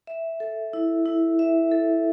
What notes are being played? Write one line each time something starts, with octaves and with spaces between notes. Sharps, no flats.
E5
A4
E4
E4
E5
A4